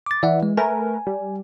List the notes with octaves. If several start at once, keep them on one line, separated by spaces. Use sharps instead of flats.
D6 A6
E3 D5 E5 F#5
G#3
A3 A#4 B4 G#5
G3